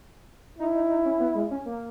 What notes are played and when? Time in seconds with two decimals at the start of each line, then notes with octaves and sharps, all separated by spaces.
0.59 D#4 E4
0.75 D#4
0.89 D#4
1.05 C#4
1.20 B3
1.35 G#3
1.51 C#4
1.66 A#3